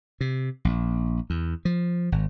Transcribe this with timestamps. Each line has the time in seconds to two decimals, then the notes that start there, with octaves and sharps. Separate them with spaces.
0.21 C3
0.65 A#1
1.30 E2
1.65 F3
2.12 G#1